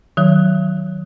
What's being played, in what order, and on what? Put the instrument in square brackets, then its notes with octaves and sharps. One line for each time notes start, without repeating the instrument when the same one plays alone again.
[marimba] D#3 F#3